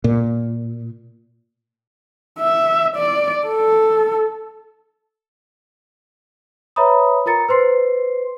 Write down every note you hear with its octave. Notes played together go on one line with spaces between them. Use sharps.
A#2
E5
D5
A4
B4 C#5 E5 A#5 B5 D#6
F4 A#4 A#5 A6 C#7
B4 C5 C6 C7